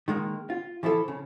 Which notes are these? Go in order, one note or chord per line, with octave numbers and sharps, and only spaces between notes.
D#3 G#3 A#3
F4
E3 F3 E4 G4 A4
C#3